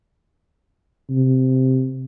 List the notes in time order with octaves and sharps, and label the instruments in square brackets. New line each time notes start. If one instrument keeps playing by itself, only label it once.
[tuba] C3